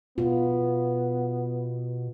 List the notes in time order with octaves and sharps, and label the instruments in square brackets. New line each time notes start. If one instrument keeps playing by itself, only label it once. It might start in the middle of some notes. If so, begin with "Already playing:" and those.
[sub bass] B2 [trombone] B3 [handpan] F4